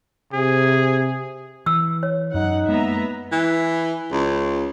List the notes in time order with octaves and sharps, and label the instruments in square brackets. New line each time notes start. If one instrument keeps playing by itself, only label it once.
[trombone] C3 [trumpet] G#4
[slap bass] E3 [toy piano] E6
[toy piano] C#5
[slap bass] F#2 [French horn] D#4 [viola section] F#5
[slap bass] G#3 A#3 [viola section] B3 E5 A#5
[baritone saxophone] E3
C#2